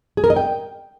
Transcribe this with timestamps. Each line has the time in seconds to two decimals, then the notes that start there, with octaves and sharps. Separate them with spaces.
0.17 G#4
0.24 A#4
0.30 D#5
0.36 G5